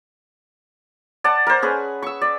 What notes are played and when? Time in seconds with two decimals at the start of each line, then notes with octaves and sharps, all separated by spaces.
1.24 D5 F#5 A5
1.47 A#4 C5
1.62 C#4 G#4 B4
2.02 C#6 E6
2.21 D5